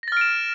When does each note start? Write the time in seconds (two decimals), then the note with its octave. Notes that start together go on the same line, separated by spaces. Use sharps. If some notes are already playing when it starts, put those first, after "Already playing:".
0.03 A#6
0.08 A6
0.12 F6
0.17 D7
0.21 E7